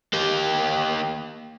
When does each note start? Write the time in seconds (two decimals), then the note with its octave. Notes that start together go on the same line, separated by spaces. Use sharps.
0.13 A#3 G4